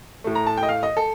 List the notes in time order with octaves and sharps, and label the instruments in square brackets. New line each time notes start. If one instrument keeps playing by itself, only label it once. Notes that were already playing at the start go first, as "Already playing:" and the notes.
[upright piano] A2 A3
A#5
A5
G5
D#5
F5
D#5
A4